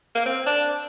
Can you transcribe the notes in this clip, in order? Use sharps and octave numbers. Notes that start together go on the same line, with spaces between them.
A#3
C4
D4